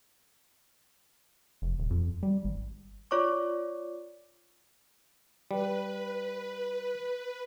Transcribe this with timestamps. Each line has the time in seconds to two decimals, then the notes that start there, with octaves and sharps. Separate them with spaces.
1.62 F1
1.79 D#1
1.90 F2
2.23 G3
2.45 G#1
3.11 F4 C#5 D5 C#6 D6
5.51 G3 B4